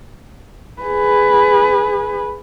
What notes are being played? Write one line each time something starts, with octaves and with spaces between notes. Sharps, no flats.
G#4 B4